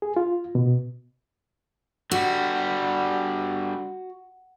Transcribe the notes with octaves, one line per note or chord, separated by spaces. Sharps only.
G#4
F4
B2
D3 G3 F#4